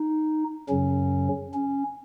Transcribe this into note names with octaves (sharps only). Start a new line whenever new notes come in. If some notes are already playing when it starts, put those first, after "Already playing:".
Already playing: D#4
F#2 C#3 F#3 C#4
C#4